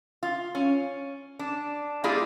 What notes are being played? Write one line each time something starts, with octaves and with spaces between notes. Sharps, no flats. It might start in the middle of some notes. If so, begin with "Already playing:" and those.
F4
C#4
D4
G3 A#3 E4 F4 G#4 D5